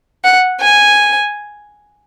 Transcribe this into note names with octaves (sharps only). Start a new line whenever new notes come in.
F#5
G#5